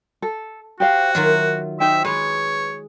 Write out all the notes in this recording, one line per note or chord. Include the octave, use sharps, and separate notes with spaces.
A4
F#4 G4 C5 F5
D#3 F#3 F4 E5
D#4 C5 E5 G5
G#3 B4 C#5